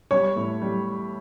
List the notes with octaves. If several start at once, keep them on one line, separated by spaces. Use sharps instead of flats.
G3 C#5
A2
G3